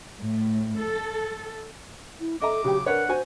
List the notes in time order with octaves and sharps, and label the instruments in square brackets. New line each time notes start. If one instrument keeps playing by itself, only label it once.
[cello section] A2
A4
[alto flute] E4
[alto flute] A4 [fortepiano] D#5 E5 A#5 [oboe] D6
[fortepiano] C#3 F#3 G5 [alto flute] G4
[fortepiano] D4 B4 C#5 [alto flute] A#4 [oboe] F#5
[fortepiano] F#4 G#5 [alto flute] C5